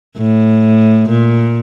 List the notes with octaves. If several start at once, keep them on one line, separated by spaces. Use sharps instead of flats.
A2
A#2